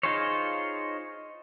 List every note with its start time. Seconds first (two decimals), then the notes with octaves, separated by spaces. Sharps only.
0.03 D#4 F4 G#4 C5 C#5